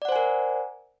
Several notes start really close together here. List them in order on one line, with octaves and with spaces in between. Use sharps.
D5 F#5 C5 G#5 A#4